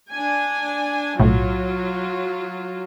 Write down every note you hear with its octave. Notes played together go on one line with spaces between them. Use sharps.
D4 G#5
B1 A2 F#3 F4